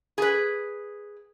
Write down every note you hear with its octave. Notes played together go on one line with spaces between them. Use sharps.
G#4 B4